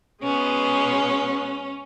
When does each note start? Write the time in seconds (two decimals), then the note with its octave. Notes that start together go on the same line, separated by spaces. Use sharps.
0.24 B2 G#3 B3 C#4